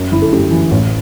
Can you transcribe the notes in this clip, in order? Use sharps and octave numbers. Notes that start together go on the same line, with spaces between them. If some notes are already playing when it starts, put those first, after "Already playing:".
Already playing: F#2
G1 E4
A4
F#2 G4
E3
A1